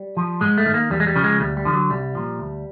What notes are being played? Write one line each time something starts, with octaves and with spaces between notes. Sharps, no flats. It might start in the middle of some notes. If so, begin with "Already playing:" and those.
Already playing: G3
F3
G#2 G#3
A3
D#3
A#3
E2 G3
G#3
G3
C#3 F3
G#3
D2 G3
G3
D3 F3
F#3
C2 G3
A#2 F3
D2